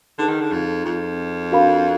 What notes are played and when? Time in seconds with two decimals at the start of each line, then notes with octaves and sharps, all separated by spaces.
0.18 D3 D#4 G#4 B4
0.29 D#3
0.40 D3
0.53 F2
0.85 F2
1.52 D4 F#4 A#4 F5 B5